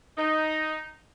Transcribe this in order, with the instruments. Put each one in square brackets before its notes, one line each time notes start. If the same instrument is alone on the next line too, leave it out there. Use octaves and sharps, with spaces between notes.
[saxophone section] D#4